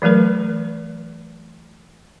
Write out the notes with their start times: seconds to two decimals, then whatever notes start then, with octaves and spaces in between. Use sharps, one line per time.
0.02 E3 F#3 A3 A#4 B4